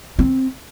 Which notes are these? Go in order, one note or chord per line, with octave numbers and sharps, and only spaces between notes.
C4